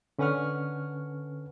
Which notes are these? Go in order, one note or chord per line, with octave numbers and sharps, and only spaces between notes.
D3 C#4 B4 F#5 C#6 F6